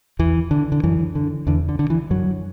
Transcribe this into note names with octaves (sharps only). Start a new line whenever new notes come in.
E2 E3
D3
D3
F#2 E3
D3
E2 D3
D3
D3
E3
F#2 F#3